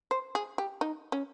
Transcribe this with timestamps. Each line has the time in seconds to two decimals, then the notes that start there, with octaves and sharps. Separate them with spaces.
0.11 C5
0.35 G#4
0.58 G4
0.81 D#4
1.12 C#4